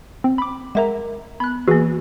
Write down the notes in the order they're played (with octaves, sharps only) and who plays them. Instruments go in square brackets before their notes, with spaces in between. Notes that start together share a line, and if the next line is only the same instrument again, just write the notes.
[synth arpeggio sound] C4
B5 D6
[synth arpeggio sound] G#3 E5 A#5 [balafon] A#4 F#5
[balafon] B3 [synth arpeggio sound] B5 F#6
[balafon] E3 A#3 [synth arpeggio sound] F#4 G#4 B4